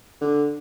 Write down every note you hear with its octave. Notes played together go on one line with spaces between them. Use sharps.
D3